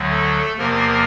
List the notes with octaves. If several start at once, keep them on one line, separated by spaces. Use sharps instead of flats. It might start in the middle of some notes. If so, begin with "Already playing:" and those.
Already playing: D2 D3 F#3
A3 A4
E2 C3 F3 A#3 A#4